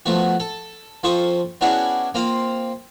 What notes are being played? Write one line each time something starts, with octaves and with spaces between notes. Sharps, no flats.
F3 A3 B3 F#4
A4 A5
F2 F3 A4 C5 C#6 D#6
B3 C#4 D4 E4 F#4 G#4
A#3 C4 F4 C5